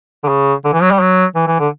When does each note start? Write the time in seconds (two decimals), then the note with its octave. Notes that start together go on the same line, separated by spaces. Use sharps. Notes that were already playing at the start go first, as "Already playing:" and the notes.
0.24 D3
0.28 C#3
0.65 D3
0.73 E3
0.82 F#3
0.91 G3
1.00 F#3
1.35 E3
1.48 E3
1.60 D3